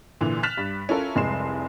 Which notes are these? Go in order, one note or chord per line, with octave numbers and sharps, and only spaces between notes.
A#2 D3 E3
F6 F#6 A6 B6 E7 F7
G2
C#4 E4 F4 A4 A#4
F1 C2 G#3 C6 C7 E7